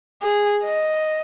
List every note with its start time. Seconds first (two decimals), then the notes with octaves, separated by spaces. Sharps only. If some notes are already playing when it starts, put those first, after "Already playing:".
0.23 G#4
0.64 D#5